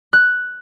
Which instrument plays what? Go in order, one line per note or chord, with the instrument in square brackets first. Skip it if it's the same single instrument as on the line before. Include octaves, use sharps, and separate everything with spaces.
[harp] F#6